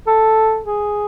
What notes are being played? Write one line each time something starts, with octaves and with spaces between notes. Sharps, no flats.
A4
G#4